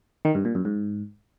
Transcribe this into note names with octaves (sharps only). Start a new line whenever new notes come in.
D#3
G2
A#2
F#2
G#2